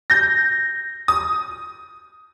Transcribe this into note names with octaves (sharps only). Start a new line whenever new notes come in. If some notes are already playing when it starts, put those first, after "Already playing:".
G6 A#6
D#6